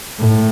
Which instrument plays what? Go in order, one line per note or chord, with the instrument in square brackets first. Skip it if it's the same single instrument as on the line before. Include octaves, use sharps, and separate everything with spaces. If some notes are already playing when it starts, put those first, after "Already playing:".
[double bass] A2